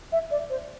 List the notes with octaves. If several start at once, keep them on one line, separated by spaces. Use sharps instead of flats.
E5
D5
C5